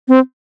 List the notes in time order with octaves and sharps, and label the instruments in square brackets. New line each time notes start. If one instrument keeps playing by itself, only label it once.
[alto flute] C4